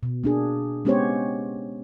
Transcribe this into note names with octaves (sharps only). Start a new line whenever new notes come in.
B2
A#3 D4 G#4
G#3 B3 C#4 G4 C5 C#5